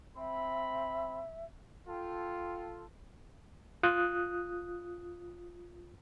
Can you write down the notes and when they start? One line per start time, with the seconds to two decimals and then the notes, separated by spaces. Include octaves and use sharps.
0.18 C4 E5 B5
1.88 F4 A4 G5
3.83 F4 D#6 F#6